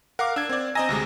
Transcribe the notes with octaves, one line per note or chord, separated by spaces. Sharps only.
A#4 F5 F#5 D6
D4 E6 G#6
C4 D5
C4 D#5 G#5 A#5 E6 A#6
D2 C3 G#3